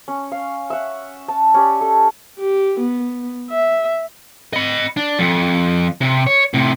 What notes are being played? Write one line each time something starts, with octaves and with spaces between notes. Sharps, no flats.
C#4
F5
E5 F#5
A5
C#4 G4 D5
A4
G4
B3
E5
D#5 B5
D4
F2
C3
C#5
A2 C3